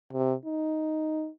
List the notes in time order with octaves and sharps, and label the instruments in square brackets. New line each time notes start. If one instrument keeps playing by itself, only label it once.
[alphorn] C3
D#4